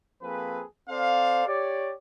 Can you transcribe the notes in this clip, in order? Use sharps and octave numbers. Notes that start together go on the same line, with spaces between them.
F3 A#3 C4 G#4 A4 B4
C4 A4 C5 D5 F5
G4 C#5 D5